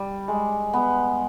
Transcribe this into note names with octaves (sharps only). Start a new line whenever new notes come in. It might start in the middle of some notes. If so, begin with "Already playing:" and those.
Already playing: G3
G#3
B3